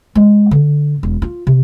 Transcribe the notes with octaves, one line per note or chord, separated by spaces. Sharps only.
G#3
D3
E1
F4
C3